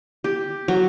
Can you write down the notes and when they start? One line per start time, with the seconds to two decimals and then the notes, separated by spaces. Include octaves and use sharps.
0.24 G4
0.68 F#3